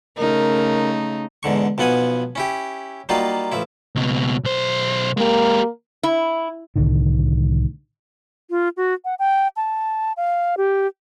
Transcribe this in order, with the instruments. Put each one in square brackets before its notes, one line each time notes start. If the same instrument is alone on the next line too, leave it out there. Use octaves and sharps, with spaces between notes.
[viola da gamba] C#3 A3 D#4 [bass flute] A#4
[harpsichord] E2 G#2 D3 C#6
B1 F3 B3 F#5 G#5 D#6
C#4 E4 G4
F#3 G3 A#3 D#4 F4
A1 F3 E4
[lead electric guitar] C#2 B2
B1 C5
[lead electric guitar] G#3 G4 [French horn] A#3
[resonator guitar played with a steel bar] E4
[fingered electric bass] C2 A2 D3 D#3
[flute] F4
F#4
F#5
G5
A5
F5
G4